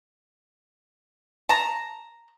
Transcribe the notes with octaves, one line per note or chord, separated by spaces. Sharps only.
A5 A#5